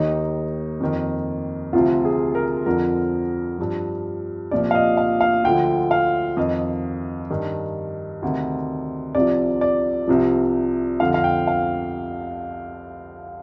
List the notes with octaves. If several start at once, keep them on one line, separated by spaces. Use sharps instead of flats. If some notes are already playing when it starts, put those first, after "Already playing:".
Already playing: D#2 D#3 D#4
F2 D#3
D2 C3 F3 F4
G#4
A#4
F2 D3 F3 A#4
G2 F3
C2 A#2 F3 D5
F5
D#5
F5
F5
D2 D3 F3 G5
F5
F2 D#3 D#5
G2 D#3
D2 C3 D#3
C2 C3 F3 D5
D5
C2 C3 F3
F2 D3 F3 F5
F5
G5
F5